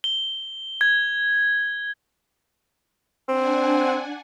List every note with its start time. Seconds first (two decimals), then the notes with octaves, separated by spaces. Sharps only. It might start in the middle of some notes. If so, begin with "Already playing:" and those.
0.04 G7
0.81 G#6
3.28 C4 D4 F#5 G#5